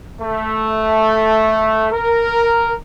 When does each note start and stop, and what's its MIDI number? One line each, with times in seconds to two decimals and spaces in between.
0.21 1.89 57
1.92 2.72 70